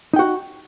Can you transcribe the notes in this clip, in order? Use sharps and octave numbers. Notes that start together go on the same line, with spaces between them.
D#4 F#4 F#5 G5